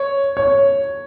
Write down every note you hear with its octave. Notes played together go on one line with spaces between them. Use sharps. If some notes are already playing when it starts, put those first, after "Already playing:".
Already playing: C#5
C#5